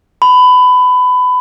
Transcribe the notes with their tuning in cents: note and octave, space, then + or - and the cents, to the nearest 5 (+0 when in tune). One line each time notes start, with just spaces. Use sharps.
B5 +20